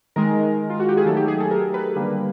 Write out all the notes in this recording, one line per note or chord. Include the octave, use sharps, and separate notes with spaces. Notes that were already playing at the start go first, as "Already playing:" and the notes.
D#3 G#3 A#4
F4
F#4
G4
G#4
D#3 F#3 A3 A4
G4
G#4
A4
A#4
B4
D3 G3 A#3